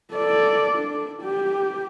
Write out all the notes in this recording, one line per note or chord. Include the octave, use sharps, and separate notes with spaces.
A4 D5
D4
G4